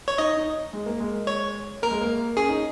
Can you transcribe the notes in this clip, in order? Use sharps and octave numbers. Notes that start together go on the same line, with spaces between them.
C#5
D#4 D#5
D#4
G#3
A#3
G#3
C#5
A#3 A#4
G#3
A#3
C#4 G#4
D#4